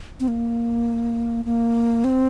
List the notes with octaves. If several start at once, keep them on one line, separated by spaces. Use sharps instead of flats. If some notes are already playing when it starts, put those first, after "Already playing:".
C4
A#3
A#3
C4